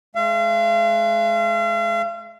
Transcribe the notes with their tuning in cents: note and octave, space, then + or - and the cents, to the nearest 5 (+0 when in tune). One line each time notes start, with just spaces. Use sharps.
G#3 +35 F5 -40